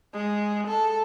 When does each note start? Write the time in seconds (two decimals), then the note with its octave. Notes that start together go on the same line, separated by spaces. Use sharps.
0.13 G#3
0.67 A4